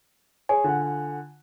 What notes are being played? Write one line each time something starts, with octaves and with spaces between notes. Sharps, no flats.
G#4 C#5 G#5
D3 F4 F#5